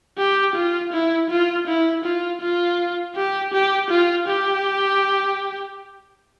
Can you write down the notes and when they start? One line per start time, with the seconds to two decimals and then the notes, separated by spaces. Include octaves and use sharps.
0.18 G4
0.55 F4
0.93 E4
1.30 F4
1.67 E4
2.04 F4
2.41 F4
3.16 G4
3.53 G4
3.90 F4
4.27 G4